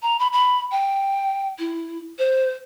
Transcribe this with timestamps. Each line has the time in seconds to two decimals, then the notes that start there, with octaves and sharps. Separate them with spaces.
0.02 A#5
0.19 B5
0.32 B5
0.72 G5
1.59 E4
2.18 C5